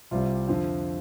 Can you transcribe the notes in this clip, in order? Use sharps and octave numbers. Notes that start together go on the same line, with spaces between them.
C2 C3 G3 F4
F2 D3 F3